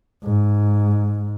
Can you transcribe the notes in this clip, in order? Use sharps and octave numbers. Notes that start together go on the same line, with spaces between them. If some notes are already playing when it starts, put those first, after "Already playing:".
G#2